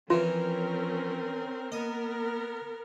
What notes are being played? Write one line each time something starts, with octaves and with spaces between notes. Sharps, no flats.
E3 F3 C4 C#4 F4 A#4
A#3 B3 A#4 D#5